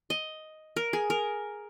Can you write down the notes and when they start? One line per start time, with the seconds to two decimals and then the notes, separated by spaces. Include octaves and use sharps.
0.10 D#5
0.76 A#4
0.93 G#4
1.10 A#4